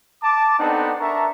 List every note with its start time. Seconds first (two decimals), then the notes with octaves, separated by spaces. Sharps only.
0.23 A5 D6
0.59 B3 C4 D4 D#4 A4 F#5
1.00 D4 A#4 E5 A5 A#5 C#6